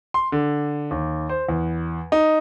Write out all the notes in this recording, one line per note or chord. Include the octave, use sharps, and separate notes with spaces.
C6
D3
D#2
C5
E2
D#4